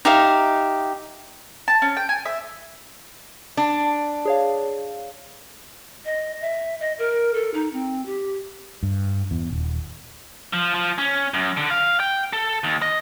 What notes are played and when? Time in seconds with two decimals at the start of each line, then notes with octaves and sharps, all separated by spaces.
0.05 D#4 G4 E5 F5
1.68 A5
1.82 C#4
1.97 G5
2.09 G#5
2.26 E5
3.57 D4
4.25 G#4 C#5 F5
6.05 D#5
6.41 E5
6.80 D#5
6.99 A#4
7.34 A4
7.54 D#4
7.73 C4
8.06 G4
8.83 G2
9.31 E2
9.50 D#1
10.53 F3
10.75 F3
10.98 C#4
11.34 F#2
11.57 D3
11.70 F5
12.00 G5
12.33 A4
12.64 D#2
12.82 D#5